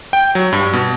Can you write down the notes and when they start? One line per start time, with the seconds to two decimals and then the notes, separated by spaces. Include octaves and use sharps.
0.13 G5
0.35 F#3
0.53 G2
0.73 B2